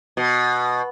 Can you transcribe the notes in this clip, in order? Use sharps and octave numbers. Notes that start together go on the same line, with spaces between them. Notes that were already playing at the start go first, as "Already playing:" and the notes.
B2